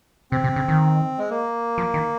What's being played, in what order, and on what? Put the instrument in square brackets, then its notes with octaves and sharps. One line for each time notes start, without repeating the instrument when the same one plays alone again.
[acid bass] C3 [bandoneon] C4
[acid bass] C3
C#3
D#3
[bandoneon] G#3
A#3
[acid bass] F3
D#3